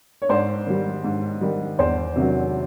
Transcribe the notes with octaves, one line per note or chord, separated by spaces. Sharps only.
C#5
G#2 C5 D5
D#3 G3
G#2
D#3 G3
E2 C5 D5
C3 D#3 F#3